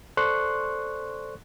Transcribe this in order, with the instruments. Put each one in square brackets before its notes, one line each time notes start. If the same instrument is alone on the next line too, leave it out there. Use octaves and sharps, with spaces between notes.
[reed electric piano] A4 C5 D5 C6 C#6 F#6